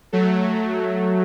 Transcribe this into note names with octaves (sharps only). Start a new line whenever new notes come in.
F#3 A3